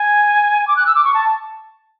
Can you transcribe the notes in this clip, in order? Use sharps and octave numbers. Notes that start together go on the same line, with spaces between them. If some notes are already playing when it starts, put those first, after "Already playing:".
Already playing: G#5
D6
F#6
E6
D6
C#6
A5